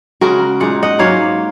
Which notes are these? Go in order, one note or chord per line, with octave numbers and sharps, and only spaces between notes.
C#3 G#3 C#4 F#4 A#4
A#2 G#3 D#4 F#5
D#5 F#5
G#2 F#3 A#3 C#5 F5